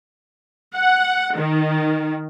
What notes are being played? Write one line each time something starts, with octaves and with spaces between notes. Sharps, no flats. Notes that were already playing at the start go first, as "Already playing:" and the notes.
F#5
D#3